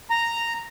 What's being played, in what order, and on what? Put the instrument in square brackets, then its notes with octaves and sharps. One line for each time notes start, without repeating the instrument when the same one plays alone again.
[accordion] A#5